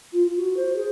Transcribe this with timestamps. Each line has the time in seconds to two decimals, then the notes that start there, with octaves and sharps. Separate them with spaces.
0.13 F4
0.26 F4
0.38 F#4
0.57 C5
0.76 G#4